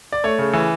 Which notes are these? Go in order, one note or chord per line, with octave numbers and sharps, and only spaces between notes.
D5
A3 C#5
C#3
E3